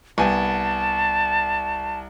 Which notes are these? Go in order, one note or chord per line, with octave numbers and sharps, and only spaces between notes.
C2 B3 G#5 A5